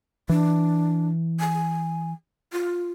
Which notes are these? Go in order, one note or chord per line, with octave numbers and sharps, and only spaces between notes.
E3 D4
G#5
F4